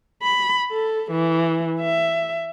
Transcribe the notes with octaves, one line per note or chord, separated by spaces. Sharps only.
B5
A4
E3
E5